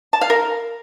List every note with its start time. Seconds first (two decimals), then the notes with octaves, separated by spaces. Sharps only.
0.13 A5
0.21 F5
0.30 A#4